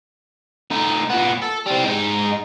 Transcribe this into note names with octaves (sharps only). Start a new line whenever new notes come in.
A3 D#4
A#2 B3
A4
G3 C4
G#3 D#4